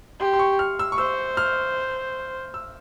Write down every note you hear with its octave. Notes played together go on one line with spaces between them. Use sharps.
G4 C6
C6
C#6
F6
E6
C#6
C5 E6
F6
E6